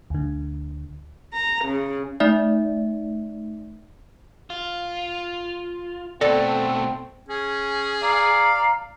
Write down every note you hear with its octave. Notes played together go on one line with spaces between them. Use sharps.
D2 D3
A#5
C#3
A3 D#4 D5 E5
F4
B2 A3 C4 A4 D5
C#4 G#4
D5 F5 A#5